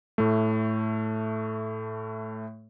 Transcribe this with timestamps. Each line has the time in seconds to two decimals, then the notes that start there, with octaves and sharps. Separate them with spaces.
0.18 A2 A3